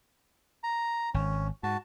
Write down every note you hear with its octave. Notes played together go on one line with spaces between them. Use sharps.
A#5
G#1 C#4
G#2 F#4 A5